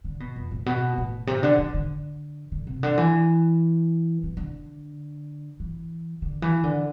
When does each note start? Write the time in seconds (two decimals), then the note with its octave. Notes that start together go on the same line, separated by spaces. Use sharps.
0.04 D3
0.20 B2
0.36 F2
0.51 A2
0.66 B2
0.98 A2
1.27 C3
1.43 D3
1.58 D3
1.74 D3
2.52 D3
2.67 C3
2.83 D3
2.98 E3
4.23 E3
4.37 D3
5.60 E3
6.22 D3
6.42 E3
6.64 D3